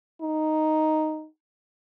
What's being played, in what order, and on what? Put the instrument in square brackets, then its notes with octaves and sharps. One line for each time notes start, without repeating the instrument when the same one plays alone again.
[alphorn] D#4